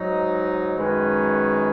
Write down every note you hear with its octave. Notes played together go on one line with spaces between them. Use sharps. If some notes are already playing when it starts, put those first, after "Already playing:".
Already playing: G#2 F#3 D#4
F#2 D#3 G#3 C#4 B4